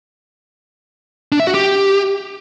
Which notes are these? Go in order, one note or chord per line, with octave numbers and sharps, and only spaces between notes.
D4
E5
F#4
G4